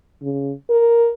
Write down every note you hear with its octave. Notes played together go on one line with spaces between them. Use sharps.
C#3
A#4